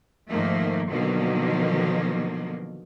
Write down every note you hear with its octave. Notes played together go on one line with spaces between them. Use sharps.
G#2 D#3 F3 A3 A#3
B2 D3 D#3 F3 F#3 A#3